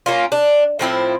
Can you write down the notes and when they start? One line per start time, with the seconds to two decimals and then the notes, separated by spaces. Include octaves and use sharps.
0.06 A#3 C#4 F4
0.32 D4
0.79 A2 F3 C4 E4